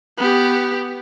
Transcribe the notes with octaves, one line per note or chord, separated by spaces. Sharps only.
B3 G4